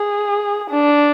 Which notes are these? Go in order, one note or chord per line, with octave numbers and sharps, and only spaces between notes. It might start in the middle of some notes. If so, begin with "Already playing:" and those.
Already playing: G#4
D4